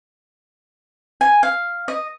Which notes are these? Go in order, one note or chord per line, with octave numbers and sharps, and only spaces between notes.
G#5
F5
D#5